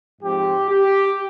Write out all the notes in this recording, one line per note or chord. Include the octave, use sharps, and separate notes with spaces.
G#2 F3 C4 G4
G4